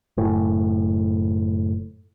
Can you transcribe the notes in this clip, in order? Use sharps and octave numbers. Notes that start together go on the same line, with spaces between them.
F#1 A2